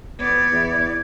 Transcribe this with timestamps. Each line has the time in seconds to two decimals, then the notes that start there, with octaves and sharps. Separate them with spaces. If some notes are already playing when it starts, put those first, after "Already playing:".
0.20 A1 F2 B3 B4 D5 G#6
0.52 E2 E4